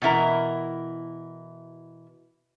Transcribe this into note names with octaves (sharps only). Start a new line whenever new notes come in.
B2 E3 E4 A#4